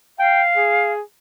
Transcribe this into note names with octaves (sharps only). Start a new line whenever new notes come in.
F5 G5
G#4